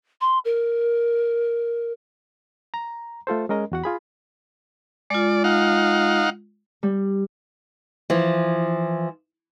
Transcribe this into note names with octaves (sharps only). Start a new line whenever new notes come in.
C6
A#4
A#5
A3 F4 A4 C5
G#3 C#4 A#4 D#5
E2 F#4 F#5
F4 G#4 B5
G#3 F4 D5
D#4 F5 F#5
G3
E3 F3